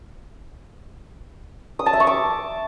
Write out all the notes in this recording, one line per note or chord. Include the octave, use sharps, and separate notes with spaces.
D#6
A5
E5
C#6
D6